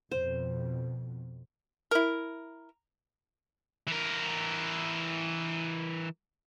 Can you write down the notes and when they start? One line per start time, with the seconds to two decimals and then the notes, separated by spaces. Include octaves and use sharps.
0.11 F2 B2 C5
1.91 E4 A#4
3.87 E3 A#4